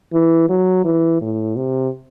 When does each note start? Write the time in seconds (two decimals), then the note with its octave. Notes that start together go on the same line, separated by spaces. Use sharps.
0.13 E3
0.49 F#3
0.85 E3
1.21 A2
1.56 C3